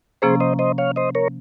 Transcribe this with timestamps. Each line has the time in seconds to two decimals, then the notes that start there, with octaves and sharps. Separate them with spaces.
0.22 C3 F3 A#3 C#4 G#4 C5
0.40 C5 D#5
0.59 C5 D#5
0.78 C#5 F5
0.96 C5 D#5
1.15 A#4 C#5